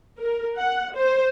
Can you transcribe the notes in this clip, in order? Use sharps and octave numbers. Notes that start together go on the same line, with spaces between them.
A#4
F#5
C5